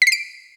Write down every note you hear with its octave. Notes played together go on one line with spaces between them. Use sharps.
B6
C7
D7